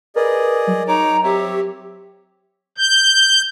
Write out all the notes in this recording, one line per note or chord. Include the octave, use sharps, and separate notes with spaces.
G#4 A#4 B4 D5 D#5
F#3
D#4 C#5 A#5 D6
C4 G4 C#5 E5
G6